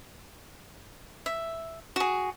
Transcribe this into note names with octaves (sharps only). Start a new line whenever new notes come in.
E5
F#4 G#4